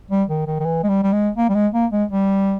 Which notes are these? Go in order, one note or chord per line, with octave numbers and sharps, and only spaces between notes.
G3
D#3
D#3
D#3
E3
G#3
G3
G3
G#3
A#3
G3
G#3
A#3
G#3
G3